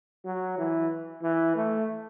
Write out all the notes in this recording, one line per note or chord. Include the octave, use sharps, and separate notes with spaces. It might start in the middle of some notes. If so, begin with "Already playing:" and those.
F#3
E3
E3
A3